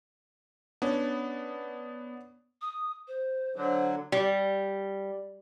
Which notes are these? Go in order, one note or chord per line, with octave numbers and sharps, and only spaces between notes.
B3 C#4 D4
D#6
C5
D3 F#3 C5
G3